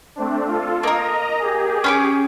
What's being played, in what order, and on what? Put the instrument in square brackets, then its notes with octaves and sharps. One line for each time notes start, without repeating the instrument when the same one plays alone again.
[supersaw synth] A3 C4 D4
F4 A4
[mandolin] A#3 A#4 [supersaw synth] D#5 A#5
[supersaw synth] G4 G#4
[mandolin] C#4 B5 D6